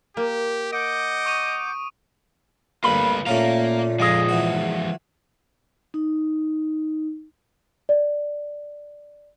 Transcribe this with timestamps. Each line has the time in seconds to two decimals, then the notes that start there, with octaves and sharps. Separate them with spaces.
0.17 A#3 G4
0.73 D#5 F#5 D6 G6 D7
1.26 C#6 D#6 D#7
2.84 D2 G2 A#3 F4 B4 B5
3.26 A#2 A3 A#3 C#4 F4 A#5
4.00 F2 F3 G#3 F4 G#4 D#5 D6
4.29 E3 F#4
5.94 D#4
7.89 D5